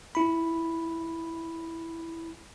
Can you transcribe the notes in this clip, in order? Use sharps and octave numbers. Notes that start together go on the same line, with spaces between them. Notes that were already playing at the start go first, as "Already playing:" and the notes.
E4 B5